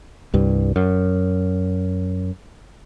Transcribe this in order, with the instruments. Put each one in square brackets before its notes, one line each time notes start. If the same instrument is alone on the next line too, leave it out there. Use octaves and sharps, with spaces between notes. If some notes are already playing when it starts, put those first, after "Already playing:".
[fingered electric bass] C2 G2
F#2